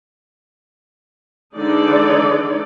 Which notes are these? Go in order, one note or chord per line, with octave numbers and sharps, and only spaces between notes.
D3 E3 G#3 D#4 A4 D5